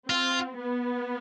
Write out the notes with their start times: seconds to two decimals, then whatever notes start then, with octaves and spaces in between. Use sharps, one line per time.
0.09 C4 F4
0.57 B3